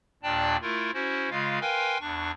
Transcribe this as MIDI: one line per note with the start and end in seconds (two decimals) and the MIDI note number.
0.23 0.57 39
0.23 0.57 46
0.23 0.57 62
0.23 0.57 74
0.23 0.57 79
0.23 0.57 81
0.62 0.91 57
0.62 0.91 64
0.62 0.91 65
0.62 0.91 70
0.94 1.29 61
0.94 1.29 64
0.94 1.29 66
0.94 1.29 72
1.30 1.59 49
1.30 1.59 56
1.30 1.59 65
1.30 1.59 77
1.61 1.98 70
1.61 1.98 71
1.61 1.98 77
1.61 1.98 79
1.61 1.98 80
1.61 1.98 84
2.00 2.31 40
2.00 2.31 62
2.00 2.31 85